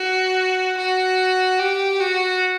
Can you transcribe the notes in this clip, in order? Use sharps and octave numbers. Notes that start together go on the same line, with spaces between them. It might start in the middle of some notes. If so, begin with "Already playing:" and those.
Already playing: F#4
F#4
G4
F#4